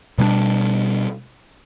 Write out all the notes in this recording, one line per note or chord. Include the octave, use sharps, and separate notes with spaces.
B2 G3 A#3 D4